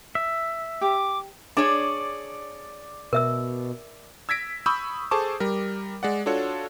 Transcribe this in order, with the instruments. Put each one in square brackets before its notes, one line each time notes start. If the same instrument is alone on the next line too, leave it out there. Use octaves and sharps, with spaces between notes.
[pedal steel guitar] E5
[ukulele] G4 [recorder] D6
[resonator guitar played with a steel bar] D4 G#4 C#5 [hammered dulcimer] D5
[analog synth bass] B2 [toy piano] A#4 E5 E6
[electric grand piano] E6 G#6 A#6 B6 D7
B5 C#6 D#6 E6 G6
G#4 A4 C5 A5 C#6 D6
G3 A#4
G#3 D5 F#5
D4 F4 F#4 A4 C#5